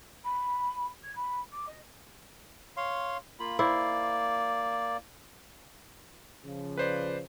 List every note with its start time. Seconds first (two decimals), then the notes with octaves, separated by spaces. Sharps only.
0.24 B5
1.03 G#6
1.15 B5
1.52 D6
1.67 D#5
2.77 C#5 F5 C6
3.40 A#3 F4 B5
3.59 A#3 E4 C5 D5
6.44 C#3 F3
6.78 B4 C5 D5